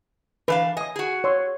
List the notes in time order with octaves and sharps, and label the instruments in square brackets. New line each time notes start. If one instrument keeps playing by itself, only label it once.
[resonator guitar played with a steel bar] E3 D4 F5 [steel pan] B4
[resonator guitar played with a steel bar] D#5 [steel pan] G#5 D#6
[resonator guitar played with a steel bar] F#4 G#4
[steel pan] C#5 C6 E6